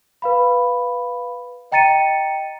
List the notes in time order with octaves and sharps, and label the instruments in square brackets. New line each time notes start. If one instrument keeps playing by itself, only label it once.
[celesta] B4 F5 B5
D#5 G5 A#5 A6 C#7 D#7